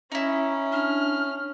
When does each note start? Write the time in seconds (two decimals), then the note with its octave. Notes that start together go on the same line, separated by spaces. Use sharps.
0.12 C#4 D#4 E4
0.72 D4 F6